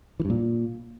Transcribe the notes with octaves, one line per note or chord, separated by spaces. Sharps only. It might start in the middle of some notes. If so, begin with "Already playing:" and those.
E3
G2
A#2